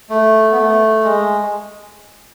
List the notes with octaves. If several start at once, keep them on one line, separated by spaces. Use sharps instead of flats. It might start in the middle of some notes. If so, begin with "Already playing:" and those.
A3
B3
A3
G#3